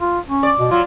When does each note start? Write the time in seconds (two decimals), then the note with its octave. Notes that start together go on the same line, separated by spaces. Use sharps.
0.01 F4
0.28 C#4
0.43 D5
0.59 B2
0.71 F#3 F4